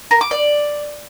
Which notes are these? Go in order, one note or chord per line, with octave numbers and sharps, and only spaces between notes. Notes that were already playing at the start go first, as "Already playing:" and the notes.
A#4
D6
D5